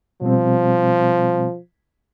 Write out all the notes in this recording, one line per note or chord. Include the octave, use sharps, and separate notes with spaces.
B2 F3 G3 C4